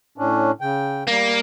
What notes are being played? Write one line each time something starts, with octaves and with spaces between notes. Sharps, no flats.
A2 C#4 D4
C#3 G5
G3 A#3